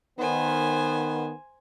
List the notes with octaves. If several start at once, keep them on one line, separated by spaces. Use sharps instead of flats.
D#3 B3 C5 G#5